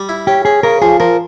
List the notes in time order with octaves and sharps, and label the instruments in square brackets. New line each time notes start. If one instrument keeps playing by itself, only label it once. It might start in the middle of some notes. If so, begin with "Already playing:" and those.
Already playing: [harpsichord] G3
E4
[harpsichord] C#4 [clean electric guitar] G4
[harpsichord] C#4 [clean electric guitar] G#4
[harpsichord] C#3 [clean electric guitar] A#4
[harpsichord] F3 [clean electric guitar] G#4
[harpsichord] F3 [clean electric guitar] A#4